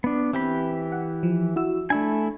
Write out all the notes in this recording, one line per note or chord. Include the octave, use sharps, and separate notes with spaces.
B3 D4
E3 C4 G4 B5
F#5
F3
E4 F#4 E6
A3 D4 E4 G#5